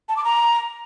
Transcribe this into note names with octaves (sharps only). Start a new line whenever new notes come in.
A5
D6
A#5